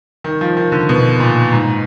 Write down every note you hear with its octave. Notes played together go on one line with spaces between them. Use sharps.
D#3
F3
D#3
D3
B2
A#2
G#2